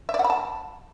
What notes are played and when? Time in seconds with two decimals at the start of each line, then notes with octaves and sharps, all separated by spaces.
0.09 E5
0.14 D5
0.19 F#5
0.24 B5
0.30 A5